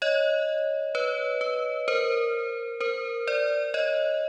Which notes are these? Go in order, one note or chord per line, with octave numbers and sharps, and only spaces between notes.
C#5 D#5
B4 C#5
B4
A#4 C5
A#4 C5
C5 D5
C#5 D#5